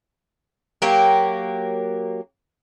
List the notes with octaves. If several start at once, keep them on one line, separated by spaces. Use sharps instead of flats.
F#3 A#3 G4